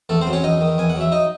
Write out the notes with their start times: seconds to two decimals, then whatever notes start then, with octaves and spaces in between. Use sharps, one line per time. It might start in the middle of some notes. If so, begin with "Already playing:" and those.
0.09 E2 A3 A4
0.21 C4 C5
0.27 F#3
0.33 C#4 C#5
0.43 E2 D#4 D#5
0.61 D#3
0.78 E2 G#5
0.90 F#5
0.96 F#3
1.01 E5
1.12 D#4 D#5